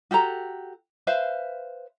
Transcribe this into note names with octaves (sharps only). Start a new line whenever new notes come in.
F#4 G4 A4 A#5
B4 C5 E5 F5